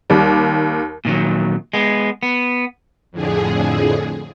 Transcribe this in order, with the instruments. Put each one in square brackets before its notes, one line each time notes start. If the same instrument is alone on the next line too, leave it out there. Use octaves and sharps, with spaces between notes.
[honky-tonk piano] D#2 G3
[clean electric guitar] A#2 D#3 F#3
G#3 B3
B3
[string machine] F2 A2 D3 G#4